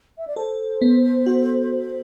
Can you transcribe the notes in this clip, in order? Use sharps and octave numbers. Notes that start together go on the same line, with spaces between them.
E5
D5
A4 C5
B3
F#4